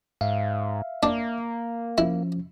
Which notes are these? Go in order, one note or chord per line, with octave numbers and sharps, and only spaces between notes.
G#2 E5 F5
A#3 D4
F3 C#4 E4